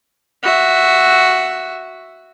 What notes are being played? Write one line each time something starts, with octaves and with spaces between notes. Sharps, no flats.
F#4 E5